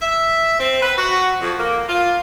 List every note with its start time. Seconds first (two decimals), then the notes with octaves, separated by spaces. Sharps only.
0.02 E5
0.59 C4
0.82 B4
0.97 F#4
1.41 F2
1.59 A#3
1.88 F4